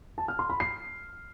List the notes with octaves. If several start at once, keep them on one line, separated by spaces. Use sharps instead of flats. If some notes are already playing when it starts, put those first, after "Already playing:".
A5
F6
C6
B5
C7